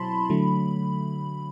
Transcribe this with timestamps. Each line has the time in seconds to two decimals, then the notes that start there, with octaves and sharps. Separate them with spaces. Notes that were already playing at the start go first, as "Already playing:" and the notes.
Already playing: B2 F#3 C4 E4 A5 B5 C6
0.30 D3 F#3 A3